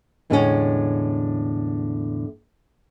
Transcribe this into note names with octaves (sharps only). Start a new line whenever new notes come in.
E2 A2 D3 G#3 B3 C#4